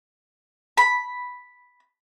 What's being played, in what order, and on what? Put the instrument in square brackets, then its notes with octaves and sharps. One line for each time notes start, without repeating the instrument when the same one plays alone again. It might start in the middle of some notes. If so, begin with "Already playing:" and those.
[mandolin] B5